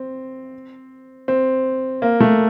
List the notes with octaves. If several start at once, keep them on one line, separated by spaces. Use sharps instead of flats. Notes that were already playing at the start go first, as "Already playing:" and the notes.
Already playing: C4
C4
A#3
A3